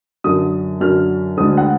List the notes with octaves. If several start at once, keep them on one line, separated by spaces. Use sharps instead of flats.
F#2 D3 F#3 D#6
F#2 D3 F#3 F6
D2 D3 G#3 D#6
F#5